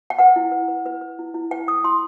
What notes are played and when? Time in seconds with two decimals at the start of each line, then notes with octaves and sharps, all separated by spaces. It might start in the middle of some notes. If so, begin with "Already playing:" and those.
0.10 G5
0.19 B4 F#5
0.36 E4
0.52 B4
0.68 B4
0.86 B4
1.01 B4
1.19 E4
1.34 E4
1.51 B4 G5
1.67 B4 D#6
1.84 E4 C6